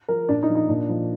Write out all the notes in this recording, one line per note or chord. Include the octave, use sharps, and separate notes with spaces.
F3 A#4
A#2 D4
D#4
F3
D#4
A#2 D4
F3